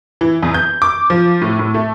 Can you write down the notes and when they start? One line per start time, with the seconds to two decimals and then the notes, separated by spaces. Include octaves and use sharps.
0.21 E3
0.42 E2
0.54 G6
0.82 D6
1.10 F3
1.42 A2
1.59 A2
1.74 A3